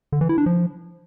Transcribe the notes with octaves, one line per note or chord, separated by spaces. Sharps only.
D3
E3
E4
D4
F3